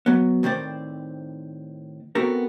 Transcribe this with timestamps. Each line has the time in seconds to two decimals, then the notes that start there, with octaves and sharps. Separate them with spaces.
0.06 F#3 B3
0.43 A2 D#3 C4 C5 D5
2.15 B3 C4 F#4 A4 A#4